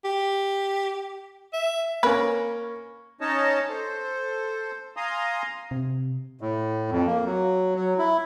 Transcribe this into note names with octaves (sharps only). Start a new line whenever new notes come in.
G4
E5
A#3 C#4 B4
C#4 D#4 C#5 D#5 A5
A4 C5
F5 G#5 A#5 C6 D#6
C3
A2
F2
A#3
F#3
F#3
E4